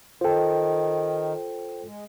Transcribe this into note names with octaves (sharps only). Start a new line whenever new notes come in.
D#3 F4 A4 C5 G5
G#3